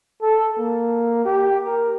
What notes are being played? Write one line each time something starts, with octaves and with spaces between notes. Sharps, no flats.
A4
A#3
G4
A#4